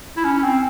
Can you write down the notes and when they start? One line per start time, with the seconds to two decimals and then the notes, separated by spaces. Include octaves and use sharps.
0.17 E4
0.24 C#4
0.44 C4